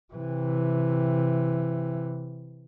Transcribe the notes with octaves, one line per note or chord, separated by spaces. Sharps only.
C3 E3